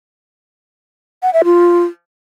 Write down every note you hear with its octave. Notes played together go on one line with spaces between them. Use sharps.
F#5
E5
F4